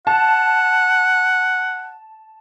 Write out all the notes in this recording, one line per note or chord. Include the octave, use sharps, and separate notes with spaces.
F#5 A5